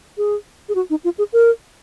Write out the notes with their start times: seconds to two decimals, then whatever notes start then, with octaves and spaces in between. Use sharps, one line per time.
0.18 G#4
0.69 G#4
0.75 F#4
0.90 D#4
1.04 F4
1.18 G#4
1.33 A#4